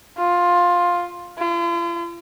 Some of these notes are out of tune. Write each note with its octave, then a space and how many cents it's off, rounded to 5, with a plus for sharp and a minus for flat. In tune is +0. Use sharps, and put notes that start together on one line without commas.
F4 +10
F4 -45